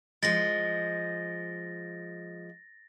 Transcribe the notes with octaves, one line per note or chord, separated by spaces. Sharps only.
F3 G#3 A6 A#6